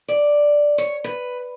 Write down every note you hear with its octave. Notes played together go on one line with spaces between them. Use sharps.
D5
C#5
B4